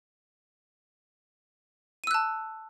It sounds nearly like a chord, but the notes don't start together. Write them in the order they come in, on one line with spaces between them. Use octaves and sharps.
D#7 E6 F#6 A5